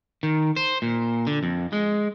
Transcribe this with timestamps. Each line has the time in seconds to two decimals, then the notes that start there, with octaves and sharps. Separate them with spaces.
0.23 D#3
0.56 C5
0.82 A#2
1.27 D3
1.43 F2
1.73 G#3